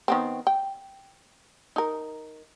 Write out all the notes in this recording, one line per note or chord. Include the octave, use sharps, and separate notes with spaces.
D#3 B3 C4
G5
D#4 A#4